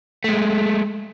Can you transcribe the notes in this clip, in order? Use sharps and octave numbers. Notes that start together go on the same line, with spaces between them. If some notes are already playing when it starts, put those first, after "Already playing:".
G#3 A3